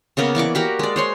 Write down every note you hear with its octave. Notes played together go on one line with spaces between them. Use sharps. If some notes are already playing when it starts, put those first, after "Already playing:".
C#3 A#3 B3 A#4
E3 D5 C#6 D6
F#4 G4 A#4
G#3 D5
C5 C#5 C6